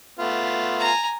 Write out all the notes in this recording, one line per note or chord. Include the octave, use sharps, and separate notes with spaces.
A3 B3 F4
G#5 A#5